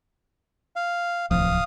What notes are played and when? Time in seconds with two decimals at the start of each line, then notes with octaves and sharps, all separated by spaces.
0.76 F5
1.31 D1 C2 F3 F5 D#6